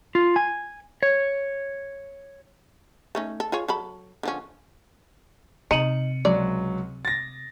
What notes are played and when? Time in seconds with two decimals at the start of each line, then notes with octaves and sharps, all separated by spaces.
0.15 F4
0.36 G#5
1.03 C#5
3.15 A3 C#4 D#4
3.40 A4
3.52 F4 G#4 C#5
3.68 F#3 A4 B5
4.23 D3 F3 C#4
5.71 C3 D#4 C#7 D#7 F#7
6.25 C#2 F#3 D5
7.05 A6 A#6